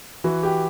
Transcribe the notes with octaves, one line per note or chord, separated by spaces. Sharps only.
E3 F#4
G4